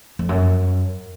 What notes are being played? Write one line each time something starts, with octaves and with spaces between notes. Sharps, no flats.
F2
F#2